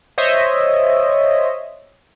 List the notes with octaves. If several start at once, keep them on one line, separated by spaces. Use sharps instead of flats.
C5 C#5 D#5 E5